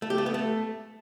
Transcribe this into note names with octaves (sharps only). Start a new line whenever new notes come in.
A3
G4
A3
B3
A3